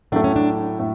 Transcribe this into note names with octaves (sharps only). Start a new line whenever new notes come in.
A2 F#3 A3 D4
C#4
D4
A2